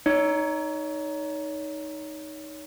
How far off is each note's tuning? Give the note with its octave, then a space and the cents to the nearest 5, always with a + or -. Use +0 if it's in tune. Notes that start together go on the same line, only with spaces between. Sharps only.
D#4 +0 C#5 +30